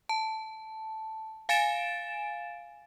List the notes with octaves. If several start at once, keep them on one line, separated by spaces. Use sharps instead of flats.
A5
F5 G#5 A6 D7 E7